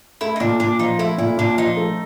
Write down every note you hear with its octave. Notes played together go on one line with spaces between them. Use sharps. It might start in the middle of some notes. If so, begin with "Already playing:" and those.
A3 E4
D#4
A#2 D4
A#2 D4
F3 D#4
A3 E4
A#2 E4
A#2 D4
F3 D#4
A3